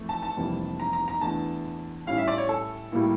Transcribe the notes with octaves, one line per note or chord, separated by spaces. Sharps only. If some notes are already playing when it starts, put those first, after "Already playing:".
Already playing: F2 E3 A3
A5
A5
F1 F2 E3 G3 A#3
A#5
A#5
A#5
E2 E3 A3 D4 A5
A2 G3 C#4 E4 F5
E5
D5
C#5
A4
A2 G3 A#3 E4